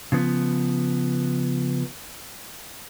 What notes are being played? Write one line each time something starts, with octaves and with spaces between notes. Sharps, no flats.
C#3 F3 B3